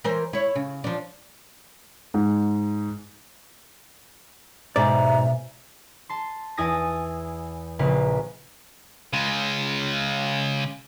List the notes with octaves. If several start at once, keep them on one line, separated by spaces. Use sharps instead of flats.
E3 A#4 C5
E4 C#5
C#3
F3 D4
G#2
G#2 B2 D5 E5 A#5
A5 C6
E2 E4 G#5 D#6 A6 A#6
A#1 C#3 A#3 B4
C#3 G#3